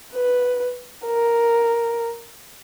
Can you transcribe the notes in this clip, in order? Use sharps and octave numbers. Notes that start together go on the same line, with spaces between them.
B4
A#4